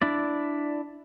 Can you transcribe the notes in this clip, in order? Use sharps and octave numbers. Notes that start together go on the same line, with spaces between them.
D4 E4 D5